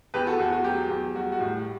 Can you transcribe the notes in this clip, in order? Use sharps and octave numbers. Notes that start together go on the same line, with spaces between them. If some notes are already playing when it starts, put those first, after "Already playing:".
E2 G4 B4
F#4 A4
E2 F#4
F#4
F#3 G4
E2
G3 F#4
F#4
A2